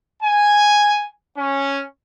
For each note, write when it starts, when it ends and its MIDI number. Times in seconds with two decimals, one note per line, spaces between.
0.23 1.06 80
1.36 1.82 61